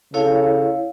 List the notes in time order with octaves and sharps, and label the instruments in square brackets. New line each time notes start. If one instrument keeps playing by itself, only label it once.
[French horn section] C#3 A4 [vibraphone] E4 C#5 F5